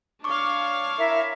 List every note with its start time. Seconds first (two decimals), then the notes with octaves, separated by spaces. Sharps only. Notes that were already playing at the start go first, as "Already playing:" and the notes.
0.24 D4 C#5 F5 C#6 D6
0.97 E4 A#4 E5